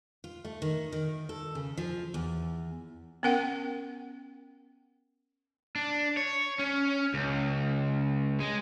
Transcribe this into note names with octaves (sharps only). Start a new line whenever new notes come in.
F4
A3
D#3
D#3
A4
C#3
F3
E2
B3 C#4 A#4 F#5 G5
D4
C#5
C#4
C#2
G#3